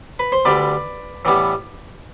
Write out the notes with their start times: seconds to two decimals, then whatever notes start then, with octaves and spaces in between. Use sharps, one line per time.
0.19 B4
0.32 C5
0.45 D2 D3 G3 B4 D5
1.25 A2 E3 G3 B3